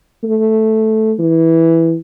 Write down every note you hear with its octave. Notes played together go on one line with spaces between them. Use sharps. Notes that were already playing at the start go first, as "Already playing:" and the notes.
A3
E3